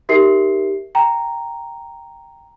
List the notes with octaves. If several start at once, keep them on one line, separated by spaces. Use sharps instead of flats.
D#4 G4 A#4 E5 C7
G5 A#5